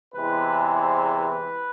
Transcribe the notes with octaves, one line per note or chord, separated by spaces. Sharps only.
E2 C3 E3 G#3 B4
C5
B4